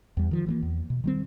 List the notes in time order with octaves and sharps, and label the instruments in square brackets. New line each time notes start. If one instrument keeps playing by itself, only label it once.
[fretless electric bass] E2 G3
D#3 F3
E3 G3 A#3
E2
B2
D#3 G3 C4